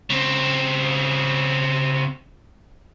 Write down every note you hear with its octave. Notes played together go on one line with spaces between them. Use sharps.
C#3 C4